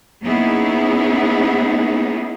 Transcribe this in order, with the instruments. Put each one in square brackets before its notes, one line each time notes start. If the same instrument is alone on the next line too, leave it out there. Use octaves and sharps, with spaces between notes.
[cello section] A#3 B3 C#4 D#4 E4 G#4